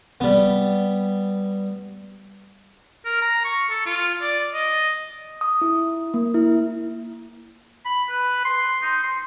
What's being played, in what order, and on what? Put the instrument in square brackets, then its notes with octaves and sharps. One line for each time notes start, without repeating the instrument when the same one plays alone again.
[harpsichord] G3 B3
[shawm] A#4
A#5
C#6
A4
F4
D5
D#5
[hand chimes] D#6
E4
A#3
E4
[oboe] B5
B4
C6
D#4
C6